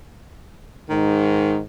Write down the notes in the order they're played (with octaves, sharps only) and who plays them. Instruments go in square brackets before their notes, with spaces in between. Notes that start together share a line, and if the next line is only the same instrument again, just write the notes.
[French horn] G#2 [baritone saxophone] D#3